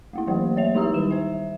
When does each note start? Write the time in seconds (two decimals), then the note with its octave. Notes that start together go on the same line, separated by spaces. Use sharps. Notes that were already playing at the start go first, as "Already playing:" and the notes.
0.13 A3 A#3 E4
0.27 E3 F#3 A3 A#3 G4 C5
0.56 F#3 A#3 C#5 E5 F7
0.74 G#3 D#4 E4 G4 A#5 E6
0.94 D#3 G3 E7
1.11 C5 E5